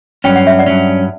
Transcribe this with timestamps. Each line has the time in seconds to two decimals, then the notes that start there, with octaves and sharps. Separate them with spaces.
0.24 G2 F#3 C#4 G5
0.36 F#5
0.47 E5
0.59 D5 F#5
0.66 G2 F#3 C#4